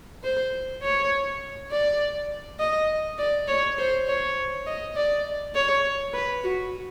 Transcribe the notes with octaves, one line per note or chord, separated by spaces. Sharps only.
C5
C#5
D5
D#5
D5
C#5
C5
C#5
D#5
D5
C#5
B4
F#4